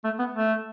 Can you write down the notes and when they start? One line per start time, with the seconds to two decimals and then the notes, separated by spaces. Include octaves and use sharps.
0.04 A3
0.19 B3
0.35 A3